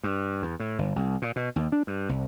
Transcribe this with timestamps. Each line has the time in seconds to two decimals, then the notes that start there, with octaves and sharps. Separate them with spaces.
0.03 G2
0.42 E2
0.60 A2
0.79 G1
0.96 C2
1.22 A#2
1.36 B2
1.56 D#2
1.72 D4
1.87 G2
2.09 C2